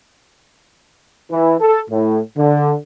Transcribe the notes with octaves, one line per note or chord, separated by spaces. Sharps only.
E3
A4
A2
D3